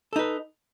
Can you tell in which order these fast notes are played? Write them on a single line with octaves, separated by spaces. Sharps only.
A4 D#4 B4